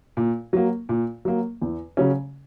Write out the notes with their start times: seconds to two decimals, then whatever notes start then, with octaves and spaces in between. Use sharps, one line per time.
0.17 A#2
0.53 F#3 A#3
0.89 A#2
1.25 F#3 A#3
1.62 E2
1.97 C#3 F#3 C#4